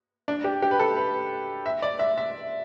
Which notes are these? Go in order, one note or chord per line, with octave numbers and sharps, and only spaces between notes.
D4
G4
G4
B4
A4
B4
E5
D5
E5
E5